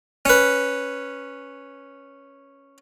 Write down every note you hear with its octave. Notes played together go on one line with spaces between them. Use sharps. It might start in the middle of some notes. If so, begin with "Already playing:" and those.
C#4 B4